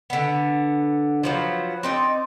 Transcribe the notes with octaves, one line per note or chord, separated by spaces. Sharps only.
D3 B3
F3 F#3 B3
C4 D#4 D5